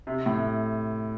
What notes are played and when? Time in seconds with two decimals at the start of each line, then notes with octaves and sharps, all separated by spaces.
0.07 C3
0.26 A2